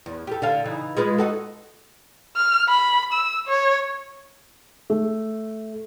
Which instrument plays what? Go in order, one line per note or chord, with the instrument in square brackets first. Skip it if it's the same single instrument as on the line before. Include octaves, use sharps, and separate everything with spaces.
[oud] E2
G4 A4
D3 A4 F5
C#3 E3 D#4
G#3 F4 B4
D#4 F#4 A4
[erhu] F6
B5
E6
C#5
[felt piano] A3